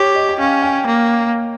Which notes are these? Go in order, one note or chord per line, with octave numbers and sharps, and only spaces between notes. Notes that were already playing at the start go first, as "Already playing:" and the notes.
Already playing: G4 C#5
D#5
G5
C#4 F5
G5
A#3